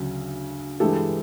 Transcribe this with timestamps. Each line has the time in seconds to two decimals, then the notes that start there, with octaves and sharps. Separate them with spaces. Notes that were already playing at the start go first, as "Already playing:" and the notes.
Already playing: D2 C#3 F#3
0.80 G2 E3 G#3 G4 A4